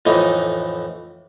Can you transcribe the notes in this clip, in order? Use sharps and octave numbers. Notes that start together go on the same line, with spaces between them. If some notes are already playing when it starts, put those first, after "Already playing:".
F2 A2 E3 D#4